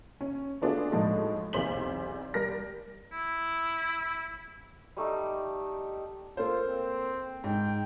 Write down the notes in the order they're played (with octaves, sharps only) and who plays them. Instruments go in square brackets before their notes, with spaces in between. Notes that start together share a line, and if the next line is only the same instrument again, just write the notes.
[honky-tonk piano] C#4
A3 B3 D4 F4 F#4 G#4
A2 F3 G#3 D#4 F#4
B1 E2 C3 C5 B6 F#7
G3 A#4 F6 A#6
[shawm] E4
[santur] G3 A3 D#4 G4
[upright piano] A#3 A4 C5 [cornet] F4
[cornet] C4
[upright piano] G#2 [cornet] G5